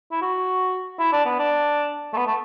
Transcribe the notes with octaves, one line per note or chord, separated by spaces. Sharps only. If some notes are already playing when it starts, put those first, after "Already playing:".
E4
F#4
E4
D4
B3
D4
A3
B3
A3